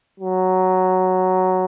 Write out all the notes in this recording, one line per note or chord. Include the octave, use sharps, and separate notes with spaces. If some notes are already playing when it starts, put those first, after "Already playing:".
F#3